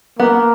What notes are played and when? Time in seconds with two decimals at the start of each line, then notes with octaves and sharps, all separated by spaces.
0.19 A#3 B3